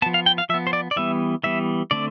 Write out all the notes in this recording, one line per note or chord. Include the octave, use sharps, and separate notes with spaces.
F3 B3 A5
F5
G5
F5
F3 B3 E5
C5
D5
D5
E3 G3 B3 E5
E3 G3 B3 E5
D3 A3 C4 D5